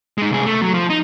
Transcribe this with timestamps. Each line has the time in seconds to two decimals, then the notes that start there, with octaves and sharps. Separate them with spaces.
0.18 G#3 D#4
0.30 C2 G#4
0.46 A3
0.62 F#3
0.74 F3
0.90 D#4